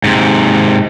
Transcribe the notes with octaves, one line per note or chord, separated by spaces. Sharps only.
G#2 C3